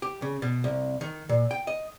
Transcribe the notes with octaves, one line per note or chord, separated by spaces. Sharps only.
G4
C#3
B2
C2
D#3
A#2
G5
D#5